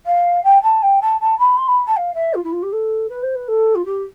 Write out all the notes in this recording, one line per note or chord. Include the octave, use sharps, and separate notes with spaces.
F5
G5
A5
G5
A5
A5
B5
C6
B5
A5
F5
E5
F4
E4
F4
G4
A4
B4
C5
B4
A4
F4
G4